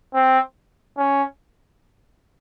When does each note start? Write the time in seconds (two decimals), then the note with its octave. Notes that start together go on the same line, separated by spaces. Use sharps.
0.14 C4
0.97 C#4